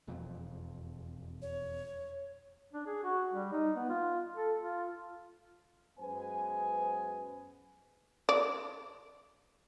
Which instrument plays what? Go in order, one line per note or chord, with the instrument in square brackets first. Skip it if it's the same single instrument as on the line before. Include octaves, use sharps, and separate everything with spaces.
[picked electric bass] E1 F2
[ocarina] C#5
[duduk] D4
G#4
F#4
G3
D#4
B3
F4
A4
F4
[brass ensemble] F#2 G#3 B3 B4 C5 G#5
[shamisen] D5